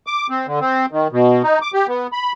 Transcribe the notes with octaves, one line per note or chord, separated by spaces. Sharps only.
D6
C4
D3
C4
D#3
B2
D#4
D6
G4
B3
B5